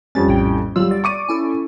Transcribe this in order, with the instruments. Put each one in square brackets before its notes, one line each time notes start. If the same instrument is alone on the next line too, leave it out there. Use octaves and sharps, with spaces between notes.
[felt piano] F2 G3 C#4 [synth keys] A6
[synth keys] A#1 A2 G5
[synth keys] G1 F#3 E6 [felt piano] G3 F4
[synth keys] D5
[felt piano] C#6 D6 D#7
[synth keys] C#4 E4 A4